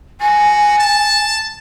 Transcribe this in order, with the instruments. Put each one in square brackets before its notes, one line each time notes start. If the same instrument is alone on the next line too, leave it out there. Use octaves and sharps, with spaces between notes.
[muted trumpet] F#4 [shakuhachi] G#5
[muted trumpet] A5